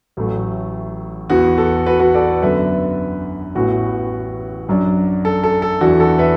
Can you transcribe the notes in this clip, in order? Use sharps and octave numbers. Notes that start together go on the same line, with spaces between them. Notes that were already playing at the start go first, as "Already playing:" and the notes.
A1 A2 F#3 A3
E2 E3 B3 F#4
A4
F#4 B4
F#4 B4
A4 D5
F#2 D3 B3 B4 E5
A1 A2 E3 B3 F#4
F#2 F#3 D4
A4
A4
A4
E2 E3 D4 F#4
A4
B4 E5